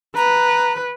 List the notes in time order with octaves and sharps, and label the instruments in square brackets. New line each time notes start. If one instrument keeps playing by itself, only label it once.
[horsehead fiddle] B4 [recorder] A#5